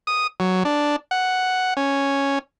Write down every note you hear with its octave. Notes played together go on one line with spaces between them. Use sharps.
D#6
F#3
D4
F#5
C#4